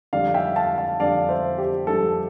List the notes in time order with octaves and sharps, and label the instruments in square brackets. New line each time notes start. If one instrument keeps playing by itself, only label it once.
[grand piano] F2 D3 G3 D5 F5
E5 G5
F5 A5
F5 A5
F2 D3 G3 D5 F5
C5 E5
G4
F2 D3 G3 A4